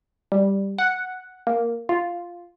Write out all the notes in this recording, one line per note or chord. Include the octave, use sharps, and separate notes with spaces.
G3
F#5
A#3
F4